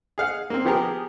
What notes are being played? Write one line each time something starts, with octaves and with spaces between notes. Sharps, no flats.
G#4 F5 F#5
A#3 C4
F3 B3 G4 G#4 A#4